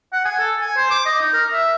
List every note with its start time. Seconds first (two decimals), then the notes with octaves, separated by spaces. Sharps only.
0.13 F#5
0.25 G#5
0.39 A4
0.61 G#5
0.76 C5
0.90 D6
1.06 D#5
1.21 D#4
1.33 A#4
1.53 E5